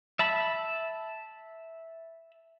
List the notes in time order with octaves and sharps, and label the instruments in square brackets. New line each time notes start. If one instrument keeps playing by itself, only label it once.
[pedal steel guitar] E5 A5 B5